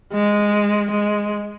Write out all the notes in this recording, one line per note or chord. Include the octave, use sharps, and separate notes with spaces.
G#3
G#3